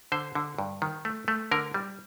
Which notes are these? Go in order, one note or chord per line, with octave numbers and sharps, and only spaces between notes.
D3 C5
D3
G2
D#3
A3
A3
D3 A#4
G3